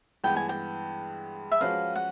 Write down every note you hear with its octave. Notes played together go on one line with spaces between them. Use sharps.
G2 E3 G#3 B3 G5
G#5
G5
E5
F3 G#3 C#4 F#4 B4 F5
F#5